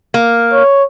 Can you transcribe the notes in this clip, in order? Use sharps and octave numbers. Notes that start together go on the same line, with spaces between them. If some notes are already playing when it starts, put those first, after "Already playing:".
A#3
C#5